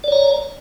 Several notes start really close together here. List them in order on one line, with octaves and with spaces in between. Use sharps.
D5 C#5 A#5